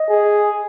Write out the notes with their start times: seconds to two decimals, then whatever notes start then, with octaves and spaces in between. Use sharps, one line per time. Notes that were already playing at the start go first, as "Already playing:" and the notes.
Already playing: D#5
0.09 G#4